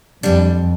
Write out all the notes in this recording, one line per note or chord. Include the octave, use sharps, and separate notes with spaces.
F2 E3 G3 D4